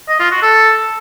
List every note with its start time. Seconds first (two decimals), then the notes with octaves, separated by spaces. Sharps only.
0.09 D#5
0.20 F4
0.31 F#4
0.42 A4